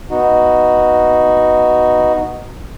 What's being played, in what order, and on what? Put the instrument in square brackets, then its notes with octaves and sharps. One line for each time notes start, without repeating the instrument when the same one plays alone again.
[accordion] B3 D#4 F#4